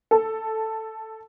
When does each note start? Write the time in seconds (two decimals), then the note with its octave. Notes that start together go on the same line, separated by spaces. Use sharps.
0.11 A4 A5